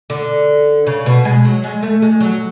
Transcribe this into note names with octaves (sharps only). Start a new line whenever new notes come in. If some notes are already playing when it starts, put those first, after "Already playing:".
D3
C#3
B2
G#3
F#3
G#3
A3
G#3
F#3